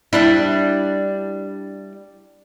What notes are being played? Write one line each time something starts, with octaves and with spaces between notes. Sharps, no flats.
G3 D4 E4